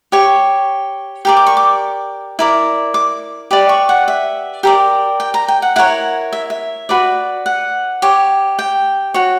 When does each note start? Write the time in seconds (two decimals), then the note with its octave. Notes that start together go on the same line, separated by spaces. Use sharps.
0.12 G4 C#5 C#6
1.25 G4 A#4 D5
1.37 D6
1.47 C#6
1.57 D6
2.39 E4 A#4 D5
2.94 D6
3.51 G4 B4 D5
3.69 C#6
3.89 F#5
4.08 E5
4.63 G4 A#4 D5
5.20 G5
5.34 A#5
5.48 G5
5.62 F#5
5.76 E4 A#4 C#5 F#5
6.33 E5
6.50 E5
6.89 F#4 B4 D5
7.46 F#5
8.02 G4 C#5
8.59 G5
9.14 F#4 C#5